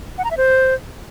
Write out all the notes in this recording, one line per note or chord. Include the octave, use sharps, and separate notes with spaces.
F#5
A#5
E5
C5